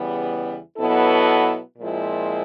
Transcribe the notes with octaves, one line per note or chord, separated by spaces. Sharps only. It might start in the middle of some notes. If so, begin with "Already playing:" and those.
Already playing: E2 C#3 E3 G3 B3
B2 F#3 B3 E4 A4
A#2 F3 G#3 C4 E4